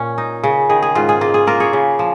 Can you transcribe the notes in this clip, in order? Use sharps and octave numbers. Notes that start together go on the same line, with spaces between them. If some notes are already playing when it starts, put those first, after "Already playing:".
Already playing: A#2 C#4
D#4
C#3
D#3 G#4
G#4
G#2 F4
G#4
A#3 F4
G#4
A#3 F4 A#4
G#4 C#5
C#3
F3